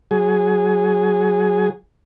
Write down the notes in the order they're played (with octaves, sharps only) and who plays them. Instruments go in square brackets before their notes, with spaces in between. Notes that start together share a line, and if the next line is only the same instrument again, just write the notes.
[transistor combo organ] F#3 G#4